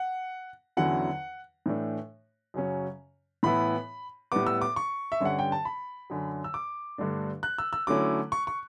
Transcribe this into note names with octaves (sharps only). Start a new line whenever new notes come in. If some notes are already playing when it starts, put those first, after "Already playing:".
Already playing: F#5
E2 D3 F#3 C#4 E4 F#5
A2 E3 A3 D4
F#2 C#3 F#3 C#4
A2 E3 B3 E4 B5
A2 G3 B3 D6
E6
D6
C#6
E5
G2 D3 G3 C#4 F#5
G5
A5
B5
F#2 D3 F#3
E6
D6
G2 D3 A3 D4
F#6
E6
E6
D3 F#3 A3 C#4 E4 D6
C#6
C#6